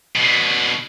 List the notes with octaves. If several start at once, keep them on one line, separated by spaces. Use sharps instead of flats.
B2 D3